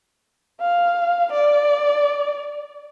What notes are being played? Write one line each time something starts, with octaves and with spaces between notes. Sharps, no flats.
F5
D5